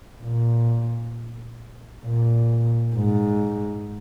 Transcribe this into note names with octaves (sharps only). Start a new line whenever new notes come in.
A#2
A#2
G#2